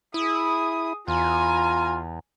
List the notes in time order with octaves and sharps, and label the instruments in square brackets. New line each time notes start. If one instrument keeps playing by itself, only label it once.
[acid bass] E4 [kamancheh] G#4 D#6
[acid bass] E2 [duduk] F4 [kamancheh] G#5 A#5